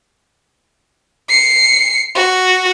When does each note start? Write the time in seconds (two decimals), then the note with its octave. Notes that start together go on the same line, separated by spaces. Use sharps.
1.29 C7 C#7
2.15 F#4